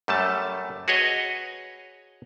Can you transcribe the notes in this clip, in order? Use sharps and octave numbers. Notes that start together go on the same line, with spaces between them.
F#2 G3 A3 A5
F#4 G#4 B4 C#5 D#5 F#5